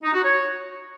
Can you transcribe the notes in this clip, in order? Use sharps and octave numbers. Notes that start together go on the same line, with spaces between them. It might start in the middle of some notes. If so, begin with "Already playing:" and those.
D#4
F#4
C#5